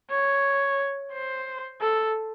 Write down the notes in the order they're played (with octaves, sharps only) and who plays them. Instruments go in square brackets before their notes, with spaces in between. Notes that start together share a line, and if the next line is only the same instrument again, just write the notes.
[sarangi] C#5
C5
A4